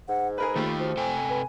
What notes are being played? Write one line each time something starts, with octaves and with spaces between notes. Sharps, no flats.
G#2 F#5
G#4 A#4 B4 B5
D#3 A3 F4 G4
F3 F#4
C3 A4 G5 G#5
B4